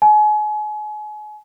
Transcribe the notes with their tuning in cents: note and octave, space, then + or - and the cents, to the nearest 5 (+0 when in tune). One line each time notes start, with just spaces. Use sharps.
G#5 +35